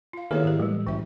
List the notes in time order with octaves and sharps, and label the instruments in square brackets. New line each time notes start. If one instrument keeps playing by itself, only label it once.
[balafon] F4 F5
[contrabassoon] E2 [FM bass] D#3 [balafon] A#3 C#5 F5 [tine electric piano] G4 A4 A#4
[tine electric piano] G#2 D5 [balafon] G4 B4
[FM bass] A2 [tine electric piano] E3 [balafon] G3 G#3
[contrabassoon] F#1 [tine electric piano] B1 G5 [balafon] E3 E5